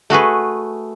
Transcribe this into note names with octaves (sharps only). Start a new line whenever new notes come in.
A3 F#4 G#4 B4